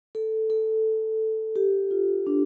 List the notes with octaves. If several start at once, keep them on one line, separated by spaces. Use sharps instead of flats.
A4
A4
G4
F4
D4